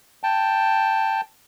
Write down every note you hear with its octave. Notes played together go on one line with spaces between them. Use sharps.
G5 A5